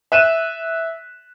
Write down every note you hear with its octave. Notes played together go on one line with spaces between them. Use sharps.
E5 F#6 D#7 E7